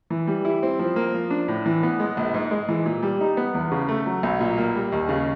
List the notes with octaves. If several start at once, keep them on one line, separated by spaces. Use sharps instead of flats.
E3
G3
E4
C4
F3
A#3
F3
D4
A2
E3
B3
G#3
A#1
G#2
G#3
E3
A#2
G3
D#4
B3
E2
C#3
A3
F#3
B1
A#2
A#3
G3
D#2
C#3